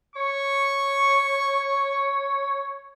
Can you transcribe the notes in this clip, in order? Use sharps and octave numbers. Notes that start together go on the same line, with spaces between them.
C#5 C#6